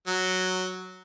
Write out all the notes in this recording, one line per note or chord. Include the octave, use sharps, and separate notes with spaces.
F#3